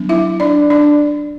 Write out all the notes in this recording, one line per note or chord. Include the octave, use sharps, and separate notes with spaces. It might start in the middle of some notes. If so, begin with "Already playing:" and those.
Already playing: F#3 B3 D4
E4 E5
D4 D5
D4 D5